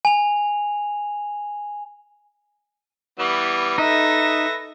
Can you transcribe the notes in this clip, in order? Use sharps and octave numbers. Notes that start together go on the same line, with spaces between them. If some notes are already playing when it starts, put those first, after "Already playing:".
G#5 F7
E3 G3 B3
D#4 A4 B4 E5 A#6